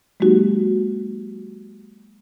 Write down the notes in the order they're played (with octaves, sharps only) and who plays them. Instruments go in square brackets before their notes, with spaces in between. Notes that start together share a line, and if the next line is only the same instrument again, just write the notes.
[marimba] F#3 G#3 A#3 D#4 F#4 G4